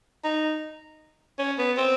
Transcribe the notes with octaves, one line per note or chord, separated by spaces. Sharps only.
D#4
C#4
B3
C4